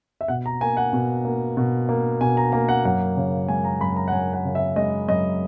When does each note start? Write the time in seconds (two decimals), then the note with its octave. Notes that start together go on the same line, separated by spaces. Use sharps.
0.21 E5
0.28 B2 F#5
0.46 A#5
0.61 A#3 G#5
0.77 F#5
0.93 B2
1.25 A#3
1.57 B2
1.89 A#3
2.21 B2 G#5
2.37 A#5
2.52 A#3 A#5
2.69 F#5
2.85 F#2 F#5
3.17 C#3
3.48 G#3 G#5
3.64 A#5
3.81 F#2 B5
3.96 A#5
4.08 F#5
4.12 F#2 G#5
4.33 F#5
4.45 C#3
4.55 E5
4.76 G#3 D#5
5.08 F#2 D#5